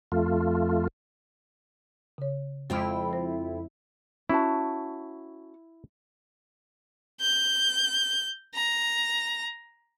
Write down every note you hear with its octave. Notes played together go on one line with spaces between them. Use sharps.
F2 A3 F4
C#3 C#5
F2 G#3 C4 E4 F4 G5 F6
C5
C#4 E4 F#4 A5
G6
A#5